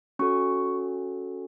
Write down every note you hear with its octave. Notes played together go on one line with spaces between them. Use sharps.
C#4 F#4 A4 C#6